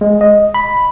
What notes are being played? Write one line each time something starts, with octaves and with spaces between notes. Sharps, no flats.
G#3
D#5
B5